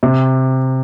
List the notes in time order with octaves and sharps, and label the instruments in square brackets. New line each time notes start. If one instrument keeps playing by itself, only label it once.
[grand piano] C3